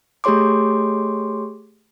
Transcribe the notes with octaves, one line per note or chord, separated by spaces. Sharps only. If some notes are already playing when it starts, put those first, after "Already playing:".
A3 G4 G#4 C#5 C6 D6